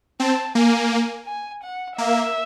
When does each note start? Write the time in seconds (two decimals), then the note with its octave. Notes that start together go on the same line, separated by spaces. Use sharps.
0.20 C4 A5
0.55 A#3 G#5
1.27 G#5
1.63 F#5
1.98 A#3 E5